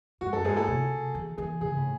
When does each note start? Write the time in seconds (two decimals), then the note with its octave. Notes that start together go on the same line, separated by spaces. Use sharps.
0.21 G#2 F#4
0.33 F#2 A4
0.45 G#2 G#4
0.56 A2 A4
0.68 C3
1.15 E3
1.37 E3 G#4
1.61 C#3 G#4
1.77 A2